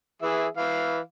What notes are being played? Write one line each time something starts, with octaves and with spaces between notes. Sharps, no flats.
E3 G#4 E5
E3 F5